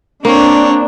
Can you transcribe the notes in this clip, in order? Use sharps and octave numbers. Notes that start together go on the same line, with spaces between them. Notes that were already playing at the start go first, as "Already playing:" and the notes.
A#3 C4 D4 C#5